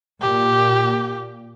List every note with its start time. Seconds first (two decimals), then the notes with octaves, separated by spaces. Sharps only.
0.21 A#2 G4